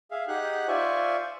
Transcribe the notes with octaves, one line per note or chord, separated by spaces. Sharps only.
G#4 E5 F5
D#4 G4 G#4 F#5 F#6
F4 C5 D5 E5 G#5 C#6